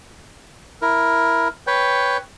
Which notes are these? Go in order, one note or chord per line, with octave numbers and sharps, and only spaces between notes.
E4 A#4
B4 C#5 G5